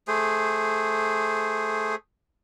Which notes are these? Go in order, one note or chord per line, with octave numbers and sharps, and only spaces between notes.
A3 G#4 C5